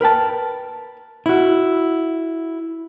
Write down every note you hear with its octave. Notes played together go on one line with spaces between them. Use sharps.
A#4 B4 G5 A5
E4 F#4